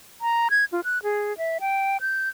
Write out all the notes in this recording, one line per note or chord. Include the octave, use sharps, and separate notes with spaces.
A#5
G#6
F4
F#6
G#4
E5
G5
G6